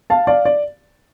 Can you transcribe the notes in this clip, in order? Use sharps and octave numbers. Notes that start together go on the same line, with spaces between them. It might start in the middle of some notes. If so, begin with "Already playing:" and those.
F5 A5
D5 F5
D5